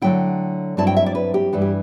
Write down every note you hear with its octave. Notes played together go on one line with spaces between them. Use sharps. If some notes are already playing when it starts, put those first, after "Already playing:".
D3 F#3 A3 E4 G5
G2 F#3 C4 E4 A5
G5
E5
D5
B4
G4
G2 E3 A3 E4
G4